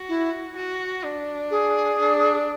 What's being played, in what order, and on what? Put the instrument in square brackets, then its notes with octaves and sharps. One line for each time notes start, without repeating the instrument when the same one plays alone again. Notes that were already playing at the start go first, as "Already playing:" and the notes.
Already playing: [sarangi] F#4
[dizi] E4
[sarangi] F#4
D4
[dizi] G#4
[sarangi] D4